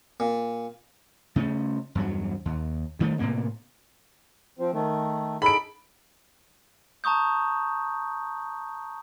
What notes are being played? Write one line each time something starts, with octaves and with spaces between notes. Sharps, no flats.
A#2
C#3 A3 C4 C#4
E2 G2 F#3
D#2
D2 D#3 G3 A3
A2 C3 A#3 B3
F3 C4
D#3 A3
D#4 G#4 A4 B5 D7
A5 A#5 C#6 D#6 G6